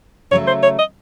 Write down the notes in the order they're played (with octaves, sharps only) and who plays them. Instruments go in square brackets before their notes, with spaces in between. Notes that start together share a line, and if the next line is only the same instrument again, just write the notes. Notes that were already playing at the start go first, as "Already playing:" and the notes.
[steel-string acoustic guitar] C#3 F#3 A3 [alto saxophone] C#5
[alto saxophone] C5
C#5
D#5